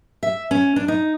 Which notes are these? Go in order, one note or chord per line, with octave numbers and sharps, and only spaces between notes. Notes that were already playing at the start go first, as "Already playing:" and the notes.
E5
C#4
D4
D#4